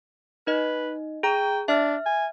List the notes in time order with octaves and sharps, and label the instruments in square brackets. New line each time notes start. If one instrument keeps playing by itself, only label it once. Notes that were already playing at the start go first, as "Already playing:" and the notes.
[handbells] D#4 D#5 [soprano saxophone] B4
[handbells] G#4 A#5 [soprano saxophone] G5
[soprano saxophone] D4 [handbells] E5 F6
[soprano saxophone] G#5